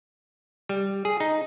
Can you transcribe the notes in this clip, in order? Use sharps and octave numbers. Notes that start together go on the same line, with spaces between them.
G3
G#4
D#4